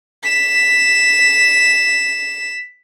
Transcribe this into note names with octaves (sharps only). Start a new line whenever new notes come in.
B6 E7